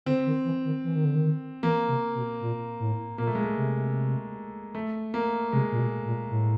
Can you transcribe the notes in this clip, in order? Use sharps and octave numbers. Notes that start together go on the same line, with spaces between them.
D3 C4
D#3
E3
D#3
E3
D#3
D3
D#3
E3 A#3
C3
B2
A#2
A2
A#2 A#3
A3
G#3
A3
C3
A3
A#3
C3 G#3
A#2
B2
A#2
A2